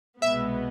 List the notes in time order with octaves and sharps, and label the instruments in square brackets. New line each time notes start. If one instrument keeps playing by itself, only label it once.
[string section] C2 B2 G#3 B3 [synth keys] E5